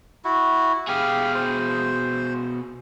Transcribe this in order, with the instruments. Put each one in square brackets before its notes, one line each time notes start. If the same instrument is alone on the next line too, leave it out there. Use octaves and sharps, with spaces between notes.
[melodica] E4 F#4
[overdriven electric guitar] B2 G#4 [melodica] G4 F5
[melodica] C5